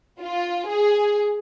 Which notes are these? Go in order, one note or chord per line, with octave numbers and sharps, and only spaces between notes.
F4
G#4